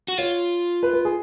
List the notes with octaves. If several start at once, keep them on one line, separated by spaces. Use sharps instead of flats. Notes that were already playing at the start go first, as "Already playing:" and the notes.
F#4
F4 C#5
B4
B4
G#4